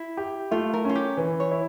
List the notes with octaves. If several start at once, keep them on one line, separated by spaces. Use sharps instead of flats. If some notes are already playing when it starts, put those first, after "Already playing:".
Already playing: E4
G4
A3 F4
A#4
C#4 F4
G4
E3
C#5
E4